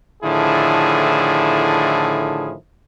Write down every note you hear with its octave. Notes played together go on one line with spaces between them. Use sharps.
A2 D3 D#3 F3 E4 G#4